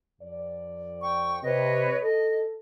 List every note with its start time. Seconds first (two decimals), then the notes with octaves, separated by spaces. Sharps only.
0.21 F2 D5
1.02 G5 C#6
1.43 C3 B4 C#5 D#5
2.03 A4 D#5